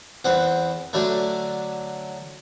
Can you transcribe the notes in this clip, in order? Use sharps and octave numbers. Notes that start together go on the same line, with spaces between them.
E2 C4 F#5
D3 F#3 A3